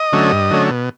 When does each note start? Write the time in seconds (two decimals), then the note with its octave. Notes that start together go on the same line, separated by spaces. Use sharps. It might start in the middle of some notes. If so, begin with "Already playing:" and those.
Already playing: D#5
0.13 D3 F#3 A3 C#4
0.32 G2
0.50 D3 F#3 A3 C#4
0.70 B2